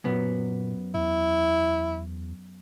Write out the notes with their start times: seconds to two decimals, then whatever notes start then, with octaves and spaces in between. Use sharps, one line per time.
0.04 F#2 A#2 B3
0.94 E2 E4